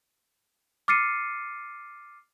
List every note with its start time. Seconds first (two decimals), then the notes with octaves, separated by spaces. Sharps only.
0.88 D6 F6 A6 C7 C#7 D#7